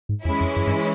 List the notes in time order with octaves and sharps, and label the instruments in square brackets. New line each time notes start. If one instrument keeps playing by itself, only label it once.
[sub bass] G#2
[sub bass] E2 [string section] E3 G#3 C#4 E4
[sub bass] F2
F#2
G2